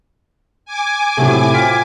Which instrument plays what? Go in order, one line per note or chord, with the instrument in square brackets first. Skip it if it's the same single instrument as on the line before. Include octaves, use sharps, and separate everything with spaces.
[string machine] G#5 D6
[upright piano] A2 C3 [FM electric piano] F#3 A3
[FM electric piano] C4 F4 F5 [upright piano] B6